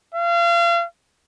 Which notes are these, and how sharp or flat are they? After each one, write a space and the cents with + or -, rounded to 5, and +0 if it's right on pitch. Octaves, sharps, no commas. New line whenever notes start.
F5 -35